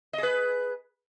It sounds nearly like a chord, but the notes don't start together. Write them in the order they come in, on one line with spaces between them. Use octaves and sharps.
D#5 G#4 B4